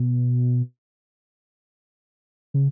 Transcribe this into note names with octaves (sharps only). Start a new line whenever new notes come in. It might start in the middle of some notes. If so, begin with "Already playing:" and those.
Already playing: B2
C#3